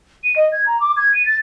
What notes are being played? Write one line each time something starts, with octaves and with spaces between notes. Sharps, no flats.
D#7
D#5
G#6
A#5
D6
G#6
D#7
A6